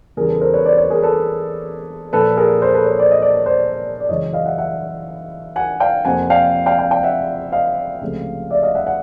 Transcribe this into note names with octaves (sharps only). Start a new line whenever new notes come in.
E2 C#3 E3 G3 B3 G#4 A#4
A4 B4
A#4 C5
B4 C#5
C5 D5
B4 C#5
G#4 A#4
A4 B4
A#2 F3 A#3 A4 B4
G#4 A#4
A#4 C5
A4 B4
B4 C#5
C5 D5
D#5
D5
C#5
C5 D5
D5
F#2 C#3 E3 G#3 C#5 D#5
D#5 F5
E5 F#5
E5 F#5
F#5 G#5
F5 G5
F2 C3 F3 A#3 F#5 G#5
F5 G5
F5 G5
F5 G5
F5 G5
E5 F#5
D#5 F5
C#2 C3 F3 A3
D5 E5
D#5 F5
E5 F#5
F#5